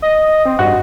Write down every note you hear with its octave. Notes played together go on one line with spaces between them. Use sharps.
D#5
C4
G2 F#4 D#5